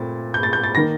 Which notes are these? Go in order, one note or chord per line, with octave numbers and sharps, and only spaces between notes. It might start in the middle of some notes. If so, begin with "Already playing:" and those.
Already playing: A#2 A3 C4 A6
G6
A6
G6
A6
D#3 A#3 A#6